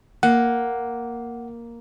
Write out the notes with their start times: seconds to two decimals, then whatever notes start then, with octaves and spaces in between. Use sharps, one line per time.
0.23 A#3 F#5